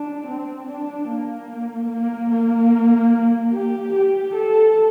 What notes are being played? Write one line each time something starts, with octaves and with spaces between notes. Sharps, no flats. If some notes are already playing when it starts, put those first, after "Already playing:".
Already playing: D4
C4
D4
A#3
A#3
A#3
G4
G4
A4